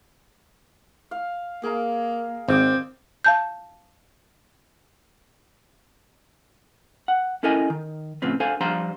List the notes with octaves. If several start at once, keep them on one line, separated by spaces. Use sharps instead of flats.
F5
A#3 G#4 A#4 F5
G#1 C4 D5 D#5 D6
F5 A5 G6
F#5
C#4 E4 A4 A#4 D#5 G#5
D#3
A2 C#3 F3 C4 B4
D4 A4 C5 F5 G#5
F3 G3 D4 C5 F5 A#5